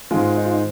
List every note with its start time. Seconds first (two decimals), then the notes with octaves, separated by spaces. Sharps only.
0.11 G#2 D#3 G#3 F4
0.37 D#4
0.45 F4
0.53 D#4